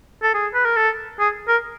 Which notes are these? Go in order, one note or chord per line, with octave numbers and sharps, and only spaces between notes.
A4
G#4
B4
A#4
A4
G#4
A#4